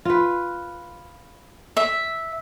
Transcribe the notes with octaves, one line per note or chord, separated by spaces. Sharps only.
F4 B4
E5